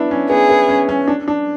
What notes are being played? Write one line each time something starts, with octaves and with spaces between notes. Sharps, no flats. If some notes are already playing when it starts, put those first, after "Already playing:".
Already playing: B3 D4 E4
C#4
B3 G#4
B3
C#4
C#4
D4
D4